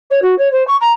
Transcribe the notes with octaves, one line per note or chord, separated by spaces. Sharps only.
C#5
F#4
C#5
C5
C#6
A#5